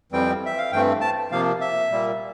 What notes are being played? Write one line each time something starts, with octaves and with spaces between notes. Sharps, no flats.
F2 E3 G3 C4 G5
E5
F5
G2 E3 A3 C4 G5
A5
C3 F3 A#3 F5
E5
A#2 G3 A#3